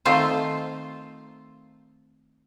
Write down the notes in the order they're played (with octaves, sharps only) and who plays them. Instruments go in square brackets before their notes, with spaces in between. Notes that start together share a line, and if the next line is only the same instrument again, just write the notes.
[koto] D#3 A3 C4 F4 C5